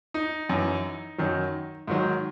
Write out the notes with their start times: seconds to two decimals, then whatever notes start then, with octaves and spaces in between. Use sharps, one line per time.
0.14 D#4
0.49 F#2 E3
1.18 F#2 D#3 F#3
1.87 G#2 D#3 F#3